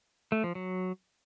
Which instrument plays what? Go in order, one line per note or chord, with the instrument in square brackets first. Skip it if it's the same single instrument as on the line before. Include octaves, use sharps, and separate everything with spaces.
[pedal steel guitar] A3
F3
F#3